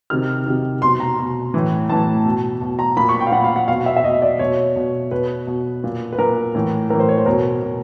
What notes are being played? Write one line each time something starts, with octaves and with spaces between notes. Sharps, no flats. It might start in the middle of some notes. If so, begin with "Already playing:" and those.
C3 D#3 F6
C3 D#3
B2 C6
A#5
B2
A2 E3
A2 E3 A5
B2
B2
A#5
A#2 B5
C#6
G5
F5
A#2 F#5
F5
F#5
B2 F5
E5
E5
B2 D#5
D5
B2 C#5
B2
B2 B4
B2
A#2
B4
A#2 A#4
A2 E3
A2 E3 A#4
C5
C#5
C5
B2 A#4
B2